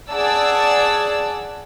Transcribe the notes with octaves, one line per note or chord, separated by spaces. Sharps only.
G#4 D5 F#5 A5 E6